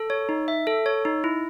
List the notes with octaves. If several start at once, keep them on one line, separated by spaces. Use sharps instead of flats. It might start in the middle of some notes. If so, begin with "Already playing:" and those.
Already playing: A4
C#5
D#4
E5
A4
C#5
D#4
E4